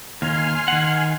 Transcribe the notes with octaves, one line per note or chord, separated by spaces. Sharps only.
D#2 G#5 C6 F6
D#3 F#5